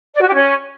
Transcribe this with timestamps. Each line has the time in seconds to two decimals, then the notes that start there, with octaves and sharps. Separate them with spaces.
0.15 D5
0.21 F#4
0.28 G4
0.35 C#4